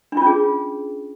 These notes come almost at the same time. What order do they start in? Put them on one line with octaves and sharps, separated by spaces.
D4 F4 C#4 G#4